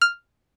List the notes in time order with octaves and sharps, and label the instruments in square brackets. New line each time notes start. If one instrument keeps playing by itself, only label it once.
[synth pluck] F6